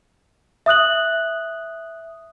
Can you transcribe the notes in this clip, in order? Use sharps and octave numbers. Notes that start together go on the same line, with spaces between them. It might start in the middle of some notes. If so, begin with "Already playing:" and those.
E5 D#6 F#6 F#7